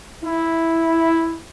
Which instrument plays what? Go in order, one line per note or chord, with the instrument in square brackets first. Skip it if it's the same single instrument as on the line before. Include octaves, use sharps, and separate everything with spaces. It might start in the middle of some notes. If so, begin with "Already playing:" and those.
[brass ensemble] E4